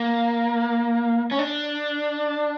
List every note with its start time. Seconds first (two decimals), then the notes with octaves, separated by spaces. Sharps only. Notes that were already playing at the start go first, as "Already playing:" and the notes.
Already playing: A#3
1.31 C#4
1.39 D4